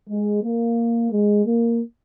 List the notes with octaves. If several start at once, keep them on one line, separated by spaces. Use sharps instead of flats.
G#3
A#3
G#3
A#3